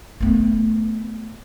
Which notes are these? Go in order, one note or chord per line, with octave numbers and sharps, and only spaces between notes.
A3 B3